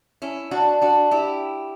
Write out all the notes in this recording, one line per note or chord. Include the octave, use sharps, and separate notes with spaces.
C#4 E4
D4 F#4
D4 F#4
E4 G4